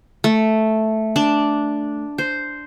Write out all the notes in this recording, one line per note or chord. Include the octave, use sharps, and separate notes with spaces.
A3
D4
C5